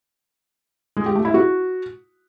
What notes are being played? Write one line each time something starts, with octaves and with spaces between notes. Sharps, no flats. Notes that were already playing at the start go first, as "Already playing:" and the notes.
G#3
G4
A3
E4
F#4